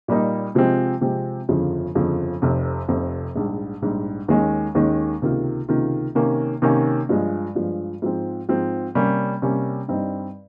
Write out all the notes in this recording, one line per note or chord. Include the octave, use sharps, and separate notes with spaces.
A#2 G3 A#3 D#4
C3 F3 G#3 C4 G4
C3 F3 G#3 C4 G4
G1 F2 C#3 F3
G1 F2 C#3 F3
F1 F2 C3
F1 F2 C3
A#1 G#2 G3
A#1 G#2 G3
D#2 D#3 G#3 C#4
D#2 D#3 G#3 C#4
C#2 C3 D#3 A#3 F4
C#2 C3 D#3 A#3 F4
C3 D#3 A#3 C#4
C3 D#3 A#3 C#4
G2 F3 G#3
G2 F3 G#3
G#2 F3 C4
G#2 F3 C4
C3 G3 A#3 C#4
C3 G3 A#3 C#4
G2 G3 C4 D#4